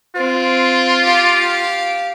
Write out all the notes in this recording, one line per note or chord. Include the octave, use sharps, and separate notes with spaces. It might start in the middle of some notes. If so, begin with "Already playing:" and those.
C4 F4
G4 F5